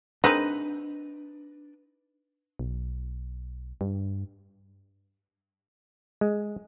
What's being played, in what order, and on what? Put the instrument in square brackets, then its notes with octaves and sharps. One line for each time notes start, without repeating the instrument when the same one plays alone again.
[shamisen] G#3 C4 A#4 [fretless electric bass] D4 [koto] D#4 B4
[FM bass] B1
G2
[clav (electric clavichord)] G#3